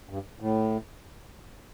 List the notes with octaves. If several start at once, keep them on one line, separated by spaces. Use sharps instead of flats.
G2
A2